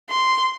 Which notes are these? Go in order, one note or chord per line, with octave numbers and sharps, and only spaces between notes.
C6